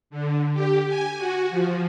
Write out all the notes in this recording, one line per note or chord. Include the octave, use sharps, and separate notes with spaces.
D3
G4
G#5
F#4
F3